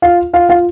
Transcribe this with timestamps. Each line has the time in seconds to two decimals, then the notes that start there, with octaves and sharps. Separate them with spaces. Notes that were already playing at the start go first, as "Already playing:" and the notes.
0.02 F4 F5
0.33 F4 F5
0.49 F4 F5